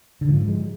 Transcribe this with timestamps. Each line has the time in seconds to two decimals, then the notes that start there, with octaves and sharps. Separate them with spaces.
0.21 D3
0.28 G#2 F3
0.48 F3 G#3